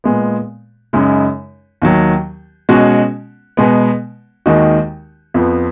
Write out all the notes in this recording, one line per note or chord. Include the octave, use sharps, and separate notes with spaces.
A#2 G#3 B3
F#2 C#3 G#3 D#4
D#2 D#3 F#3
B2 G#3 C#4 F#4
B2 G#3 B3
D#2 D#3 G#3 D#4 F#4
F2 F3 B3